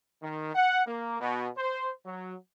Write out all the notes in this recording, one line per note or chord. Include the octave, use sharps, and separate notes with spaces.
D#3
F#5
A#3
B2
C5
F#3